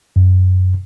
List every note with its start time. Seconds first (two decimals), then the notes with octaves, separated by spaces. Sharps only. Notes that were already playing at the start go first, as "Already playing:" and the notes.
0.16 F#2